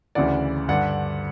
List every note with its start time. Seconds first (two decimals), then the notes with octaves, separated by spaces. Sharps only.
0.15 D2 C#3 E3 D5 F#5
0.68 G2 D3 D5 F#5